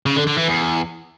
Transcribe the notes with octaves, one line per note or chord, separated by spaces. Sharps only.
C#3
D3
D3
E3
E2